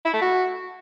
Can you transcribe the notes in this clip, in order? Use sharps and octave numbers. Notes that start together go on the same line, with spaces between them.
E4
A3
F#4